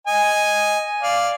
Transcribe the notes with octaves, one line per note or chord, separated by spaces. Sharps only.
D#5 G#5
D5 F5